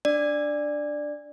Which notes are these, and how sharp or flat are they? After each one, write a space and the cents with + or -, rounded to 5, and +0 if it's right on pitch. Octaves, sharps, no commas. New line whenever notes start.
D4 +0 D5 +10